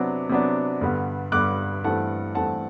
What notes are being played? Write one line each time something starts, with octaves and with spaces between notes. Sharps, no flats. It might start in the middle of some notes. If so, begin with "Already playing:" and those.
Already playing: C3 F#3 B3 D4 D6
C3 F#3 B3 D4
G2 D3 G3 B3
G2 D3 G3 B3 D6 F#6
G2 E3 A3 C4 F#5 A5
G2 E3 A3 C4 F#5 A5